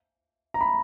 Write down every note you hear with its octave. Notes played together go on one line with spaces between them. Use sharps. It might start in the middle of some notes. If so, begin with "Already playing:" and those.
A#5
B5